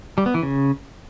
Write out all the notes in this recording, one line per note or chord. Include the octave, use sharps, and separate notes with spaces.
G3
B3
E3
C#3